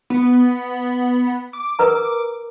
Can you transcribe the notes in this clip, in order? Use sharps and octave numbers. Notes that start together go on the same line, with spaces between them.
B3
D6
A#4 B4 A#5